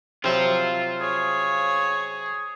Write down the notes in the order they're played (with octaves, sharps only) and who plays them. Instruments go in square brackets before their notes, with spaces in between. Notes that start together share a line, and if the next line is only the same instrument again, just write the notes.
[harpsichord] C3 F#3 E4 [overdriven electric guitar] F4 C5
[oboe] G#4 [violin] C#5